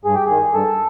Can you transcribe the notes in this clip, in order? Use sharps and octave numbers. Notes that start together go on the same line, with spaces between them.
G2 G#4
G4
D#3 G#4
G2 A4